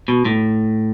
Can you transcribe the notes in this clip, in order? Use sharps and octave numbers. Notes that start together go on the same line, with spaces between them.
B2
A2